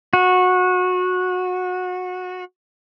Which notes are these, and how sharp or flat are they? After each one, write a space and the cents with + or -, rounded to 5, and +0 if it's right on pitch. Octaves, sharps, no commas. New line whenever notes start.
F#4 -20